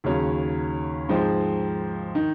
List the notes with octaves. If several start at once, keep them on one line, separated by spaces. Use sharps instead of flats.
D#2 C#3 F#3 C#4
G#2 F3 G#3 C4
D#3